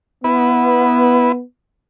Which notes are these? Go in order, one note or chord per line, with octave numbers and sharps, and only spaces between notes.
B3 E4 B4